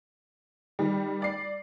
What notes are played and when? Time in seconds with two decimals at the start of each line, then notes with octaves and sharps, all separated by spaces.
0.79 D#3 G3
1.22 D5 C7